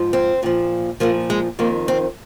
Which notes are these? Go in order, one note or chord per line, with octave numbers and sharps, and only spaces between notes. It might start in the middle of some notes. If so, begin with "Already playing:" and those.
Already playing: G#2 F3
C4
A#2 F3
A#2 F3 A#3
G#3
F2 D#3 A#3
C4